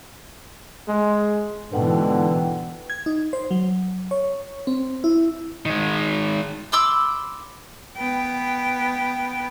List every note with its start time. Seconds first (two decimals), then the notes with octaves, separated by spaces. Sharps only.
0.88 G#3
1.72 G#2 B2 D3 E3 B4 F#5 G5
2.90 G#6
3.06 D#4
3.33 C5
3.51 F#3
4.11 C#5
4.67 C4
5.04 E4
5.66 D#3 G#3
6.72 B5 C6 D6 E6
7.97 B3 G5